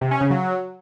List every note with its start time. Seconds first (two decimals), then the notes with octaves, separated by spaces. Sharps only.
0.01 C3
0.11 C#4
0.21 C#3
0.31 F#3